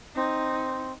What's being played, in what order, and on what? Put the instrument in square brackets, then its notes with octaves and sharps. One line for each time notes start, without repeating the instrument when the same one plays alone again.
[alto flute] C4 [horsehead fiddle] D#4